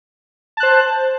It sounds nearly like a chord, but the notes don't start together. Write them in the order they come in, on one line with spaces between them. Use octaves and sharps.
A5 F#6 C5